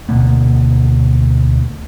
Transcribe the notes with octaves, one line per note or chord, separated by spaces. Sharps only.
D2 B2 A#3 B3